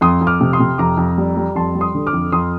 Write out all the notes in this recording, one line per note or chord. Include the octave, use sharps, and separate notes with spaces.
F2 C6 D#6
F2
D6 F6
C3
C6 D#6
C3
F2 A#5 D6
F2
G3
G3
F2 A5 C6
G3
C6 D#6
D3
D6 F6
F2
F2 C6 D#6